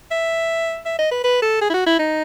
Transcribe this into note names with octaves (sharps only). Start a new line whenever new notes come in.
E5
E5
D#5
B4
B4
A4
G#4
E4
F#4
E4
D#4